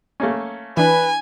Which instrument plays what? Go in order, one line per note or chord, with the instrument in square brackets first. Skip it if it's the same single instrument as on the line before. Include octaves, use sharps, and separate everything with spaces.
[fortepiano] A3 A#3 C#4
[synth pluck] E3 D4 [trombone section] B4 [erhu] G#5